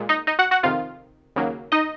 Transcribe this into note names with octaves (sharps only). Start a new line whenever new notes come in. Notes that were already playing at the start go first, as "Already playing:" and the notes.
Already playing: A#2 G#3
D#4 D#5
D#4 D#5
F#4 F#5
F#4 F#5
F2 C3 D#3 F4 F5
D#2 C#3 F#3 A#3
D#4 D#5